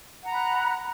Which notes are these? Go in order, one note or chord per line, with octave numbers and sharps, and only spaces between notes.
F#5 A#5 B5 F#6